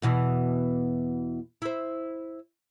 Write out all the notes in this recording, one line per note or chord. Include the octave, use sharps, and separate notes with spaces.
E2 B2 E3
E4 C5